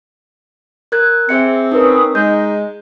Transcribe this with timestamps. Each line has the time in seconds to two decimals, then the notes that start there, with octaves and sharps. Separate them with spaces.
0.92 A#4 F#6 G#6
1.29 C4 G#4 E5 C#7
1.72 C#4 D#4 A#4 B4 D#6
2.15 G#3 D#4 G6